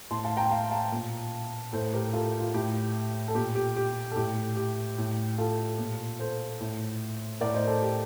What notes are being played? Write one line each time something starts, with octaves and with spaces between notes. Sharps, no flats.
A2 A5 C6
F5 A5
G5 A#5
F5 A5
F5 A5
A#2
A2 A4 C5
G4 A#4
F4 A4
F4
A2 G4
A4
A#2 G4
G4
G4
A4
A2 G4
G4
A2
F4 A4
A#2
A4 C5
A2
A2 A#4 D5
C5 D#5
A4 C5
G4